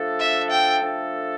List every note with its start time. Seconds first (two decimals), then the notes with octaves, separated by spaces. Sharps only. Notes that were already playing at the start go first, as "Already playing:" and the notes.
Already playing: F3 A3 D4 A4
0.20 E5
0.50 G5
0.82 F3 A3 D4 A4